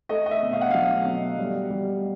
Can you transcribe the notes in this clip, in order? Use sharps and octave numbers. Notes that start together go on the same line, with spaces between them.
A3 D#5
D#5
E5
B2
F5
F#5
F#3 F5
B2
G3
G3